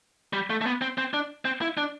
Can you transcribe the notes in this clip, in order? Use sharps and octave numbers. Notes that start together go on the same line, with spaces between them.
G3
A3
A3
B3
C4
C4
D4
C4
E4
D4